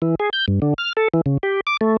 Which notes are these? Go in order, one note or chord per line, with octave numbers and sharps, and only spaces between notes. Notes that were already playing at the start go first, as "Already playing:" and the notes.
E3
G#4
G6
G2
D3
F6
A4
E3
C#3
G4
D6
A3